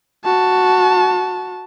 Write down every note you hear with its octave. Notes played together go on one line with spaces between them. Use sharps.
F#4 A5